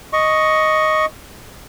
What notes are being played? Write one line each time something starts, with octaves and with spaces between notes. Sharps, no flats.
D#5 C#6